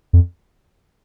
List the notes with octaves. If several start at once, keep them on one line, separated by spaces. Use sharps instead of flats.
F2